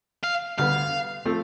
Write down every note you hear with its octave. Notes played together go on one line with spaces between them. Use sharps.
F5
D2 D3 G3 B3 F5
F3 A3 C4